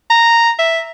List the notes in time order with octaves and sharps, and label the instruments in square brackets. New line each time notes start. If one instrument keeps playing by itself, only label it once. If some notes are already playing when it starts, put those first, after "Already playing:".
[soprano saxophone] A#5
E5